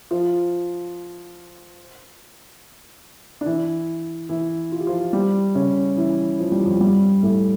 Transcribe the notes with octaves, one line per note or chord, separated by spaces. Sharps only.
F3 F4
D4
E3 E4
E3 E4
F4
G4
F3 F4
G3 G4
C#3 C#4
E3 E4
F3
G3
F2 F3
G2 G3
A2 A3